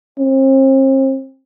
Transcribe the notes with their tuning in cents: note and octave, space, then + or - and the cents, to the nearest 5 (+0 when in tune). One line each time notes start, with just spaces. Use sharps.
C4 +40